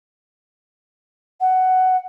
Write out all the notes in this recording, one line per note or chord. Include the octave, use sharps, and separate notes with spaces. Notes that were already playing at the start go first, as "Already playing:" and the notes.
F#5